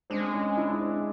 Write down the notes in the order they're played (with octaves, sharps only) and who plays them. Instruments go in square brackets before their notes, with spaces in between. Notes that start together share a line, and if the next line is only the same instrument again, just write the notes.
[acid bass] G#3 [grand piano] C4 D4
[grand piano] C#4 D#4
D4 E4
C4 D4